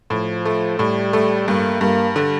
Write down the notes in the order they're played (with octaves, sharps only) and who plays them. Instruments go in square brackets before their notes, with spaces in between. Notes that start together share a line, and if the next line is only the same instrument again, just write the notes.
[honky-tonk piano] A2 [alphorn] F3
[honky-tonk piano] A3
[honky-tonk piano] A2 [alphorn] G3
[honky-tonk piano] A3
[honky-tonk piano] G2 [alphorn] A#3
[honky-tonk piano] G2 [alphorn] A#3
[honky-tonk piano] D3